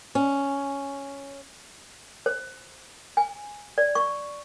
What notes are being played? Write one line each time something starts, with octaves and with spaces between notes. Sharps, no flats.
C#4
C5
G#5
D5
C#6